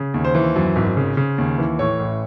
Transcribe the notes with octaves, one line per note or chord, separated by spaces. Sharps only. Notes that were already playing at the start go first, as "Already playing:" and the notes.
Already playing: C#3
D#2
C5
E3
F#2
G#1
C#3
C#3
D#2
E3
A2 C#5
A1